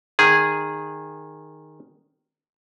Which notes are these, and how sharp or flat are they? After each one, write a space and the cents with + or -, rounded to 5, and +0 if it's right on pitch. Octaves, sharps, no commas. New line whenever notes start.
D#3 -10 G#4 -10